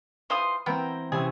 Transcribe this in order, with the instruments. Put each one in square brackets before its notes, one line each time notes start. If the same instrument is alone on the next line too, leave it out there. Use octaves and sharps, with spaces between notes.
[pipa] E3 F4 [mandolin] C5 C6 D#6
[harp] E3 C4 [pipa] B3 A#4 [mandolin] G5
[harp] C3 E3 C#4 [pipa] G#4